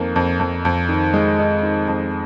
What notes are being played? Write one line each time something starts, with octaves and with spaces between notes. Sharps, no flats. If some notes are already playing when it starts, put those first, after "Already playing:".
Already playing: F2 D#3 A#3
F2
F2
F2
D#3
G#3
D#4
D#3
F2